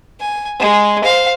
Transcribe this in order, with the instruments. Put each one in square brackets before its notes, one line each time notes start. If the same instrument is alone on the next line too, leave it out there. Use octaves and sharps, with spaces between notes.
[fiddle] G#5
G#3 G#4
C5 F5